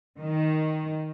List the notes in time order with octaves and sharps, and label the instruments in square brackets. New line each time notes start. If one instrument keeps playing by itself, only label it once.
[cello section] D#3